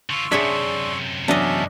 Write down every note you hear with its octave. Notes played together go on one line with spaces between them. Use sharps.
D3 F4 C6 C#6 E6
F#2 C3 D4 G#4 C#5 E5
E2 F#3 C#4 D4 D#5 E5 A5